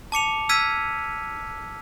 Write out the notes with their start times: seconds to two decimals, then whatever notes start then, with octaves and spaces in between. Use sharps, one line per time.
0.12 A5 D6 C#7 F7
0.49 E6 F6 G#6 B6 D#7